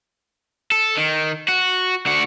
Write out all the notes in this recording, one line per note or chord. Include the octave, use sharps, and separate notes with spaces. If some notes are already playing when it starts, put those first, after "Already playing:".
A4
D#3
F#4
D3 F#4